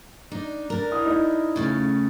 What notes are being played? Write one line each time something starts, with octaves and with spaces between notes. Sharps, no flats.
D4 D#4
D4 A#4
E4 D#6
D#4 E4 D#5
C#3 A3 C#4